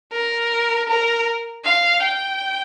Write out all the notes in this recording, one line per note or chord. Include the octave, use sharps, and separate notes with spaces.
A#4
A#4
F5
G5